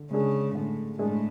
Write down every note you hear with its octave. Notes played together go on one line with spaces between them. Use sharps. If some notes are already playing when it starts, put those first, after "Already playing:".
Already playing: D3
C#3 G#3 D4 G#4
A2 D3
A2 G#3 D4 G#4